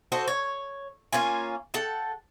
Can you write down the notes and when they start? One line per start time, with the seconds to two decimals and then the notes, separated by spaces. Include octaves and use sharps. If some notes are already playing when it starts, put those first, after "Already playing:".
0.12 F#4 A4 C5 D#5
0.28 C#5
1.13 A#3 C#4 F4 G#5
1.74 A4 F#5 G5